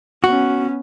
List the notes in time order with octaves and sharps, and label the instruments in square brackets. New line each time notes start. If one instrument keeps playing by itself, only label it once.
[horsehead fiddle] B3 C#4 [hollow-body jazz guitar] F#4